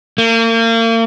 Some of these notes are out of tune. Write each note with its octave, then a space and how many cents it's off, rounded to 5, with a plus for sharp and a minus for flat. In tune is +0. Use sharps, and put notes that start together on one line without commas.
A#3 -40